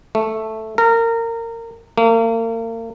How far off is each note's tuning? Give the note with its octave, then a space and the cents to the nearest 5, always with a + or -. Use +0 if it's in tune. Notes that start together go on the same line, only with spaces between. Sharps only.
A3 +0
A#4 -25
A#3 -40